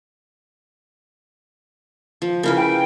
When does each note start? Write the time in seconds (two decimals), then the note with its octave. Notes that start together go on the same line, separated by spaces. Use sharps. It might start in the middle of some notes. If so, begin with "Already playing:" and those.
2.22 F3
2.43 C#3 E4 A#4 B4
2.56 G5